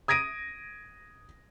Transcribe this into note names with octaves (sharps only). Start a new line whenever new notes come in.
D#6 G#6 A#6 D7 D#7